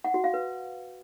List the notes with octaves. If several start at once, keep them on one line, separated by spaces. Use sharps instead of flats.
F#5
F#4
F5
B4